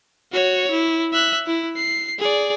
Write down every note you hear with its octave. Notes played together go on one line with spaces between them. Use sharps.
F#4 C#5
E4
E5 F#6
E4
C7
G#4 D5